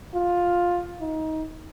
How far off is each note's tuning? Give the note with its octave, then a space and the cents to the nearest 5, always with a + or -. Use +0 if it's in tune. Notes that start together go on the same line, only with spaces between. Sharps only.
F4 +10
D#4 +20